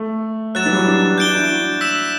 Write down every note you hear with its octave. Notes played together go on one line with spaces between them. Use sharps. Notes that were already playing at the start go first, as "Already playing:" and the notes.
Already playing: A3
F#3 F#6 A6 E7
E3
G3
F#3
D4
D4
D4 G6 D7 G7
D4
E4
F#4
E6 B6 E7